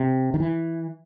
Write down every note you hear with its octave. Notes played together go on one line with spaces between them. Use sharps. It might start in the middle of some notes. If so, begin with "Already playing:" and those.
Already playing: C3
D#3
E3